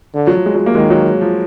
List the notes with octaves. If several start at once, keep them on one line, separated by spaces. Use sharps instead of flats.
D3
F#3
F3
G#3
F#3
A#3
D#3 G#3
F#3
F3